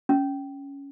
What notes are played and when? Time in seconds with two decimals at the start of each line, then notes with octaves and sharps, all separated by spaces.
0.09 C#4